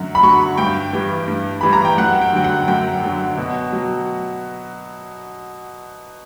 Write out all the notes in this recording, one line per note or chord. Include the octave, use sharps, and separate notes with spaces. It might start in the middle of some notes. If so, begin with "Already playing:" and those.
Already playing: F#2 D3 F#3
B5
D3 F#3 C#6
G2 G5
E3 G3
G2
E3 G3 B5
A#5
G5
F#2 F#5
G5
D3 F#3 G5
F#5
F#2 G5
D3 F#3
B2
F#3